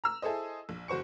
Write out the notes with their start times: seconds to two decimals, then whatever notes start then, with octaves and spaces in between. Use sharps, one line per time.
0.04 A#5 E6
0.22 E4 G#4 A4 C5 D#5
0.69 A#1
0.88 F#1 F#4 C5 C#6 C#7